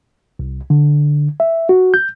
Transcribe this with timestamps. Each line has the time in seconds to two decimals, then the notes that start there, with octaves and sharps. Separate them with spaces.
0.39 C2
0.70 D3
1.40 E5
1.69 F#4
1.94 G6